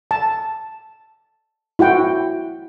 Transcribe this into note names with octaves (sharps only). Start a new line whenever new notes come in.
A5
E4 F#4 F#5 G5